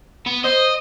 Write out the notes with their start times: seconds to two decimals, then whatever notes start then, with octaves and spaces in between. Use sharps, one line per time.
0.26 B3
0.44 C5 D#5